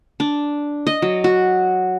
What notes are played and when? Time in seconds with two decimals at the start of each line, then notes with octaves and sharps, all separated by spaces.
0.20 D4
0.87 D#5
1.02 F#3
1.24 F#4